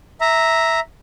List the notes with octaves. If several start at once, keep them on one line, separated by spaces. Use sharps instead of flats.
E5 A#5